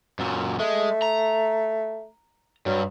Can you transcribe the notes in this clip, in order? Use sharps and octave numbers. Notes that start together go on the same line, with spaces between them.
F#2 A#2
G#3 A3
A#5
G2 F#3